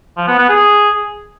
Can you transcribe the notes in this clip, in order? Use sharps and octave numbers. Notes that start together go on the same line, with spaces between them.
F3
B3
B3
G#4